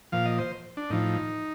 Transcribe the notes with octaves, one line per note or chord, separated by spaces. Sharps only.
A#2 F3 F5
D#5
C5
D4
A2 F3 D#4